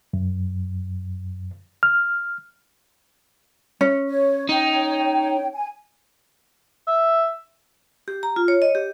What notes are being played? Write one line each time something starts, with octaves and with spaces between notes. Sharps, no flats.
F#2
F6
C#4
C#5
D#4 C#5 G5
G#5
E5
G4
A#5
F4
C#5
D#5
G4